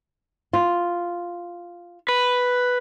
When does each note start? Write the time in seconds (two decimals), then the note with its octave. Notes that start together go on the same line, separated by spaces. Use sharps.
0.53 F4
2.09 B4